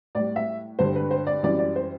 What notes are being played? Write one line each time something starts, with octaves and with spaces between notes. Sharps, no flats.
A2 G3 D5
E5
G2 D3 G3 C5
B4
C5
D5
F#2 E3 G3 D5
D5
C5